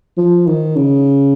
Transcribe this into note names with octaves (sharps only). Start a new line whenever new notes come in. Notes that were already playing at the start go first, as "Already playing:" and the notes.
F3
D#3
C#3